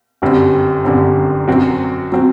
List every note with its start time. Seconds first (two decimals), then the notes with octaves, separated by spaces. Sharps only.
0.22 G1 F#2 D3 G3 C4
0.84 G1 F#2 D3 G3 C4
1.48 F#2 F#3 C4 F#4
2.12 F#3 C4 F#4